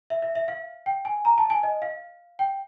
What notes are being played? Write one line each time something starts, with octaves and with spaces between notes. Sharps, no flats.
E5
E5
E5
F5
G5
G#5
A#5
A5
G#5
D#5
F5
G5